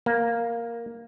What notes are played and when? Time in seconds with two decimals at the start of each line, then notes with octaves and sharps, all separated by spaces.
0.06 A#3